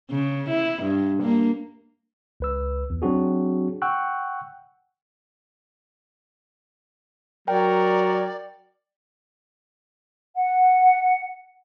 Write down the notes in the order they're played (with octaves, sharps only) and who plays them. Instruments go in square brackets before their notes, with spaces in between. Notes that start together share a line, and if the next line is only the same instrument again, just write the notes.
[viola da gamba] C#3
E4
G2
A#3
[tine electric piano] C#2 B4 E6
E2
F#3 C4 D4 F#4 G#4
F#5 G5 C#6 E6 F#6
[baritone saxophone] F#3 [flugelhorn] A#4 [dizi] D5 [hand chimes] G5
[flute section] F#5